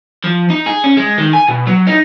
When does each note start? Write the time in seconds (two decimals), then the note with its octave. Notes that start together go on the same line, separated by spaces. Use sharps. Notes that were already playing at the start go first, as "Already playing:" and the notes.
0.24 F3
0.50 D#4
0.66 G#4
0.84 C#4
0.97 G#3
1.18 D#3
1.33 G#5
1.49 B2
1.67 F#3
1.87 D#4